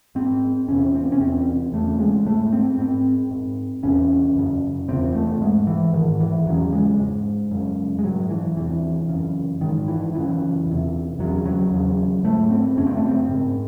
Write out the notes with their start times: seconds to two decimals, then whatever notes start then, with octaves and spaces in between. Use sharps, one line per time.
0.15 G#2 C4
0.68 E2 C3 C#4
0.95 C4
1.12 C#4
1.20 E2 C3 C4
1.73 E2 C#3 A3
1.99 G#3
2.26 G#2 A3
2.52 C4
2.78 G#2 C4
3.31 G#2
3.83 E2 C3 C#4
4.36 F#2 C#3
4.88 E2 C3 C4
5.14 A3
5.41 G#2 G#3
5.67 E3
5.93 G#2 D#3
6.20 E3
6.46 E2 C#3 F#3
6.73 G#3
6.99 G#2
7.51 F#2 C#3
7.99 G#3
8.03 G#2 F#3
8.30 E3
8.56 E2 C3 E3
9.09 F#2 C#3
9.61 G#2 D#3
9.88 E3
10.14 F#2 C#3 E3
10.67 E2 C3
11.19 E2 C#3 F#3
11.46 F#3
11.72 E2 C#3
12.24 G#2 A3
12.50 C4
12.77 F#2 C#3 C#4
12.87 C4
12.97 A3
13.06 C4
13.29 G#2